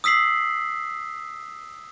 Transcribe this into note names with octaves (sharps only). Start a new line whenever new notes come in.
D#6 E6 B6 C7 F#7